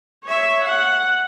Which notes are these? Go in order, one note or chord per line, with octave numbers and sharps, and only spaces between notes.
C#5 E5
F#5